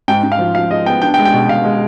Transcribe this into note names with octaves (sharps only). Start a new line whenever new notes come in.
G#2 G5
G#2
F5
F3
F3 F5
G#3 D#5
B3 G5
D4 G5
G5
G#3
G5
B2
B2 F5
G#3